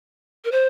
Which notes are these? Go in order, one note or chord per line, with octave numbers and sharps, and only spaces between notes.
A#4
C5